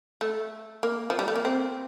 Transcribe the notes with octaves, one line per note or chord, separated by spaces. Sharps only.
A3
A#3
F3
G3
A3
A#3
C4